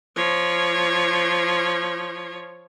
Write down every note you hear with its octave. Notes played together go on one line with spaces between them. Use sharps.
F3 C#5